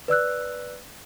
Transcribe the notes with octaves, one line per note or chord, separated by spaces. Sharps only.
B4 D5 E6 F#6